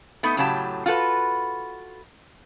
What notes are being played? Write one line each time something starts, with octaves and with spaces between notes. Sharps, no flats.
A3 B3 D#4
A2 C#3 F#3 G4 A5
F4 F#4 A4 B4